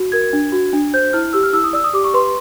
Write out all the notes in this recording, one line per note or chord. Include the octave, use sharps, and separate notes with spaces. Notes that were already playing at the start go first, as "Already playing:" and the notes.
Already playing: F#4
A#4 G#6
D4
F#4
D4
C5 G6
E4 F6
G4 E6
F6
E4 E6
D#6
D5 E6
D#6
G4 D6
C#6
B4 C6